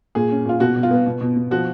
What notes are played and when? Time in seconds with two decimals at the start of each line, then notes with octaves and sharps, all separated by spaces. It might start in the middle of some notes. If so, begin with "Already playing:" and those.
0.15 A#2 G#4
0.31 C#4
0.45 A#2 F4
0.60 B2 F#4
0.76 B2
0.83 F4
0.91 B3
1.06 B2
1.21 B2
1.36 B2
1.51 F3 F#4